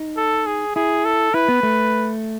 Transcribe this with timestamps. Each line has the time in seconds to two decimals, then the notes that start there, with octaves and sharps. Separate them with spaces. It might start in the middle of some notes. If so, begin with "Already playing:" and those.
Already playing: D#4
0.17 A4
0.46 G#4
0.75 E4 G#4
1.05 A4
1.34 E4 B4
1.48 B3
1.63 A3